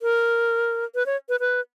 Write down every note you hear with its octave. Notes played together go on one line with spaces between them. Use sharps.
A#4
B4
C#5
B4
B4